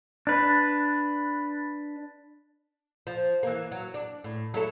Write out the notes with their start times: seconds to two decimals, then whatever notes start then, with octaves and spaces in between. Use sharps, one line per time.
0.27 D4 B4
3.07 F3
3.43 E3 A#3
3.72 F#3
3.94 D4
4.24 A2
4.54 F#3 E4 A4